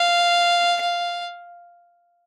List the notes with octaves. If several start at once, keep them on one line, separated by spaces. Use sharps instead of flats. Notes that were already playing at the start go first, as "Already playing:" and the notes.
Already playing: F5
F5